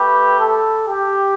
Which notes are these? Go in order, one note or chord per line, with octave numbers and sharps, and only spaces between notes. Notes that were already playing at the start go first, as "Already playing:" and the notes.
Already playing: A3 G4 B4
A4
G4